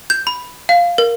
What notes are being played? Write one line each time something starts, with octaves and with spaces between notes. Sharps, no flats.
G6
B5
F5
A#4